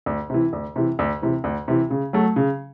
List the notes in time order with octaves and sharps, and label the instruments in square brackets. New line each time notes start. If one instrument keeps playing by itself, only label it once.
[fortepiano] D2
C3 E3
D2
C3 E3
D2
C3 E3
D2
C3 E3
C#3
F#3 A3
C#3